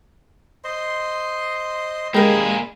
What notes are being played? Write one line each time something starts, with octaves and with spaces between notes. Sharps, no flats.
C5 D#5 C6
G#3 A#3 G4 G#4 A#4 D#5 B5